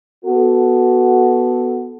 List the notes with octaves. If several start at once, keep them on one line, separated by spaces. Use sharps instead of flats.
B3 F#4 A4